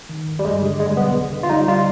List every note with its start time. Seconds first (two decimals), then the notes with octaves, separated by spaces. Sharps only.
0.09 D#3
0.27 G#1
0.39 G3
0.45 G2 G#3
0.62 D3
0.80 G3 G#3
0.97 B1 B3
1.15 G1
1.32 D3
1.43 F4
1.49 G3 D#4
1.68 G3 F4